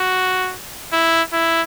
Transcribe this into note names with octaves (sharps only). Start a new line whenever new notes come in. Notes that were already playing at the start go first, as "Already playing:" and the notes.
Already playing: F#4
E4
E4